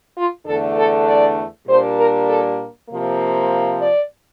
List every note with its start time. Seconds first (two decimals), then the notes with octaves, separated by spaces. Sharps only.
0.17 F4
0.47 E2 D3 A3 D4 A4
0.77 A4
1.07 D5
1.68 A#2 G3 A#3 D4 C5
1.98 A#4
2.29 A4
2.90 C3 F3 A#3
3.81 D5